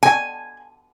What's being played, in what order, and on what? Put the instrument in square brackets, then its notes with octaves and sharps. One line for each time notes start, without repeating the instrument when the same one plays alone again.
[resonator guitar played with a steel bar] G#5